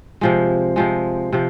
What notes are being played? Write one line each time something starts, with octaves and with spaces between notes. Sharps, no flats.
C3 F3 G#3
C3 F3 G#3
C3 F3